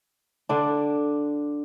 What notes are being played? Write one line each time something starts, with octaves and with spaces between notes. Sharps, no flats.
D3 D4